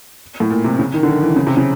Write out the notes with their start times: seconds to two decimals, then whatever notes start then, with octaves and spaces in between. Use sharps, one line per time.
0.40 A2
0.50 A#2
0.64 C3
0.79 C#3
0.94 D#3
1.03 D3
1.08 D#3
1.22 E3
1.36 C#3
1.47 C3
1.57 C#3